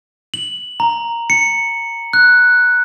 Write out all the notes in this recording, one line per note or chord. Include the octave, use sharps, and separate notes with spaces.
F#7
A#5
C#7
F#6